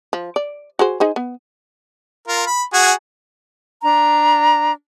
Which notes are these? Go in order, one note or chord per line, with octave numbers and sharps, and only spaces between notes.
F3
D5
F#4 G#4 C5
D#4 G#4 C5
B3
F4 A#4
B5
F#4 G#4 G#5
D4 A#5